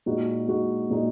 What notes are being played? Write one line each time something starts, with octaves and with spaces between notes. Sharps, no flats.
A#2 G#3 D#4 F#4
A#2 G#3 D#4 F#4
A#2 G#3 D#4 F#4